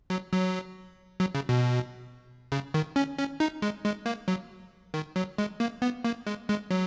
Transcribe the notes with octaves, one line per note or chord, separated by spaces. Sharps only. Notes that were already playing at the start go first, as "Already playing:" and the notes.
F#3
F#3
F#3
C#3
B2
C#3
D#3
C#4
C#4
D#4
G#3
G#3
A#3
F#3
D#3
F#3
G#3
A#3
B3
A#3
G#3
G#3
F#3